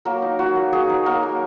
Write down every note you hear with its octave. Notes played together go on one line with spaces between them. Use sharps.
F#3 A#3 A#4
D#4
F#3 F#4
A#3
F#3 G#4
D#4
F#3 A#3 A#4
A#3